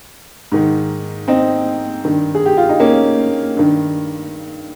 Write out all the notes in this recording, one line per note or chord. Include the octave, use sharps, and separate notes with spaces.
G#2 D#3
C4 D#4
G2 D#3
G#4
G4
F4
D#4
A#3 C#4
G2 D#3